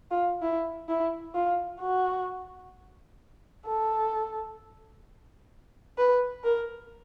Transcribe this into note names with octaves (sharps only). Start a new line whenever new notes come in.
F4
E4
E4
F4
F#4
A4
B4
A#4